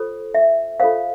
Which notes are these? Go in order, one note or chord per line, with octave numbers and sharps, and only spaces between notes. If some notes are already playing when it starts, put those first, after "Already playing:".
Already playing: F4 A4 C5
E5
F4 A4 C5 F5